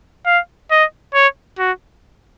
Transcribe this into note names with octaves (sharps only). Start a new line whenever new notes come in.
F5
D#5
C#5
F#4